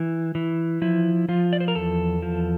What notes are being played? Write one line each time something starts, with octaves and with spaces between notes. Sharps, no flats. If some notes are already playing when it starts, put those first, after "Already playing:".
Already playing: E3
E3
F3 E4
F3 F4
D5
C5
A#4
E2 A4
F3